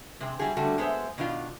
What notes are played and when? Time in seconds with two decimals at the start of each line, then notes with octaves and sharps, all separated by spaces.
0.20 C3 G#3 C4
0.39 F#3 G3 E4 F#4 G#4
0.57 D3 G3 A3 F#4
0.78 G#3 B3 G#4 C5 E5
1.18 B2 D#3 D4 F4